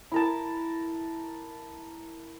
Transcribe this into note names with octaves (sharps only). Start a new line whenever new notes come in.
E4 A#4 A5